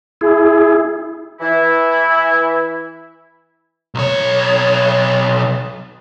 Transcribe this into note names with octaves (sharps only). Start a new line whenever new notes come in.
E4 G#4
E3 E4
B1 C#5